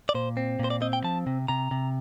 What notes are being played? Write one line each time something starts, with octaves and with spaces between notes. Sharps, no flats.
D5
A#2 C5
C4
A#2 C5
D5
C4 D#5
G5
F3 A5
C3
C3 A#5
C3